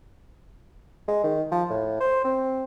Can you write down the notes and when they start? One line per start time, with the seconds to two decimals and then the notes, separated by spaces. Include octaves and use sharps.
1.08 G#3
1.24 D#3
1.52 F3
1.70 A2
2.01 C5
2.25 C4